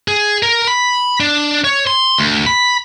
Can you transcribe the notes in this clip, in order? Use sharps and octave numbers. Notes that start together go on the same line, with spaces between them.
G#4
A#4
B5
D4
C#5
C6
D2
B5